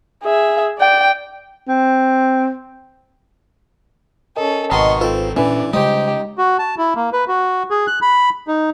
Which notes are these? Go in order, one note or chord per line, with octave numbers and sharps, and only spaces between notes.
G#4 E5
D5 G5
C4
C#4 A4 A#4 D#5
G#1 B2 D#3 A#5 C6 C#6
C4 F4 A4 B4 C5
A#2 E3 C#4 D4 E4 B4 D5
C#3 G3 G#3 D#4 G4 C5
F#4
A5
E4
A#3
B4
F#4
G#4
F#6
B5
D#4